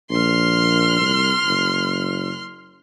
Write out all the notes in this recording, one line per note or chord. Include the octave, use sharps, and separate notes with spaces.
A#1 C6 F6
C2
F#1